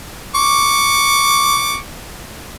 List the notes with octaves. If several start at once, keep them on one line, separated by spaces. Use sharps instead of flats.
C#6 D6